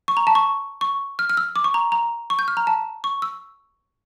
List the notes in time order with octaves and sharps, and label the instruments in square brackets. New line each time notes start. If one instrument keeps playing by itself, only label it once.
[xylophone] C#6
A#5
A5
C#6
C#6
F6
F6
E6
D6
C#6
A#5
A#5
C#6
G6
F6
A#5
A5
C#6
E6